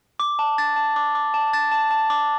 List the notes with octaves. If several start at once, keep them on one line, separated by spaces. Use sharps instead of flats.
D6
A5
A6
A5
D6
D6
A5
A6
A5
A5
D6